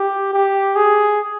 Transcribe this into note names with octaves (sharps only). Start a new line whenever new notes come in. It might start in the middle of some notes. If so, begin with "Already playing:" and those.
Already playing: G4
G4
G#4